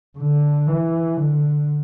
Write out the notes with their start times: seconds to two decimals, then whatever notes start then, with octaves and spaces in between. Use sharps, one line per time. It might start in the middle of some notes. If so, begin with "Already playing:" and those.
0.18 D3
0.67 E3
1.17 D3